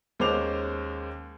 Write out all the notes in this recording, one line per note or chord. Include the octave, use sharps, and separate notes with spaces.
D#2 G#3 C#4 C5 D6 F7